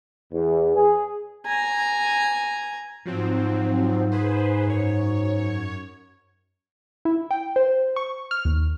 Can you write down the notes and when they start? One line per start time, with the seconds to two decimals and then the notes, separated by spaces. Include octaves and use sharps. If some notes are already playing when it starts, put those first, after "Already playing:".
0.32 E2
0.76 G#4
1.46 G#5 A#5
3.06 G#2 F3 F#3 C4
4.12 G#4 B4 C5
4.67 F#2 C#5
7.05 E4
7.31 G5
7.56 C5
7.96 C#6
8.31 F6
8.45 D#2